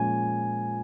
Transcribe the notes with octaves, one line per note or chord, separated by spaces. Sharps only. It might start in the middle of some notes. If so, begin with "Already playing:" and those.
Already playing: A#2 F3 G#3 C#4 G#5